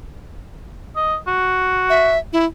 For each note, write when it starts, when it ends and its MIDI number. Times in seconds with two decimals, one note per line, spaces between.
0.96 1.16 75
1.27 2.15 66
1.90 2.18 76
2.33 2.45 64